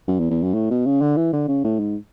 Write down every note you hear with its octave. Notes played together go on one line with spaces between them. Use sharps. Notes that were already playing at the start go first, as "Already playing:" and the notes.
F#2
E2
E2
F#2
A2
B2
C#3
D3
E3
D3
C#3
A2
G#2